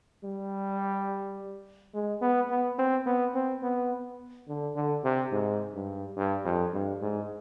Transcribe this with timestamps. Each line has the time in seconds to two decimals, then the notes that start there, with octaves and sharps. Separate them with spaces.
0.24 G3
1.94 G#3
2.21 B3
2.50 B3
2.79 C4
3.06 B3
3.34 C4
3.63 B3
4.48 D3
4.76 D3
5.04 C3
5.32 G#2
5.75 G2
6.17 G2
6.45 F2
6.73 G2
7.02 G#2